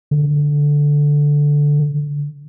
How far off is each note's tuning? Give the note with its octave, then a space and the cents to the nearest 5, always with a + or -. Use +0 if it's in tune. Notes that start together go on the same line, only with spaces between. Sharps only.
D3 -5